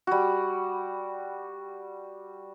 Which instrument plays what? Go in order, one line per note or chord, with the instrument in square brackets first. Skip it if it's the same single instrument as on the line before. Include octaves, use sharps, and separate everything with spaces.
[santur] G3 F#4